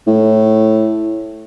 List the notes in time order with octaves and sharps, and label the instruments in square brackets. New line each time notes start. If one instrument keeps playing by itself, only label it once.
[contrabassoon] A2